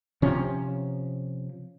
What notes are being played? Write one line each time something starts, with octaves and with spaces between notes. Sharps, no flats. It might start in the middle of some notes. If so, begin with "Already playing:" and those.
C3 F3 C#4